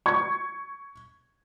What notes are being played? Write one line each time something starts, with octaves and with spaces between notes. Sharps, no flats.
C#6 G#6